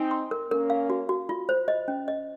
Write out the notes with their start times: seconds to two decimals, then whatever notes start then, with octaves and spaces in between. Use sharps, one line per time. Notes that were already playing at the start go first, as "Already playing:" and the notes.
Already playing: C4 D#4 G#5
0.11 C6
0.31 A#4
0.51 A#3 C#4 A#4
0.70 F5
0.90 F#4
1.09 F#4
1.29 F4
1.49 C5
1.68 D#5
1.88 C#4
2.08 D#5